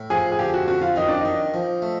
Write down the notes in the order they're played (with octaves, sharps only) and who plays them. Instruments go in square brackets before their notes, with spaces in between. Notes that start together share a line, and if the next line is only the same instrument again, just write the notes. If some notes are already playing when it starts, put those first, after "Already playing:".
Already playing: [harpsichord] A2
[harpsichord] F3 [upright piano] G#4
[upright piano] G#4
[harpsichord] D3 [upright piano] G4
[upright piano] F#4
[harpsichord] F2 [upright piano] F#4
[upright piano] F4
[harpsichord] D#3 [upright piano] D#4
[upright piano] D4
[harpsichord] D#3 [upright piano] D#4
[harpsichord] F3
A3